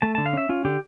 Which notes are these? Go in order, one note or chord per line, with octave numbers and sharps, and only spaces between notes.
A3 A5
D3 A5
F5
C#4 E5
C#4 F4
D3 G4